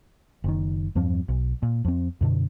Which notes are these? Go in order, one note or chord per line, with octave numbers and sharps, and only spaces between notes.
F#1 D#3
E2 G2 F3 C4
B1
A#2
F2 C4
F#2 B2 D3